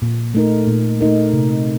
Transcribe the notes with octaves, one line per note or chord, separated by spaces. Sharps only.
A#2
A3 D#4 A#4
A#2
A3 D#4 A#4
C3